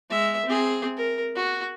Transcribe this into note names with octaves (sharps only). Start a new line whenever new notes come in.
G#3 E5
C4 G#4
A#4
F#4